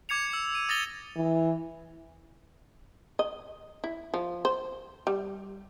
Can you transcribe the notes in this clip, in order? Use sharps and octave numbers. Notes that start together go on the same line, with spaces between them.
D6 G#6 C#7 F7
E6
D#7
D#6 A6 A#6 F7 G7
E3
D#5
E4
F3
C5
G3